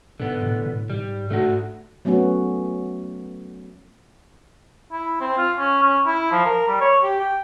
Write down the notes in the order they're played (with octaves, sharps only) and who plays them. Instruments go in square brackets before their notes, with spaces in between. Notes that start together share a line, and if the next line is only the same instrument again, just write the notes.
[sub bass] G#2 [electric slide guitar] D3 B3
[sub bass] A2
A2
[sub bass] G#2 [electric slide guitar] G3
[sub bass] G#2 [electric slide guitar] A3 D4 F#4
[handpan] F#3 A3 B3 C#4 F#4
[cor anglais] E4
C4
F4
C#4
C#4
E4
F3
A#4
G3
C#5
G4
G5